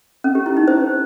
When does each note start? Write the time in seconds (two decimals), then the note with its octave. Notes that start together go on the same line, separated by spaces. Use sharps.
0.24 C#4
0.35 G4
0.46 E4
0.57 D#4
0.68 C5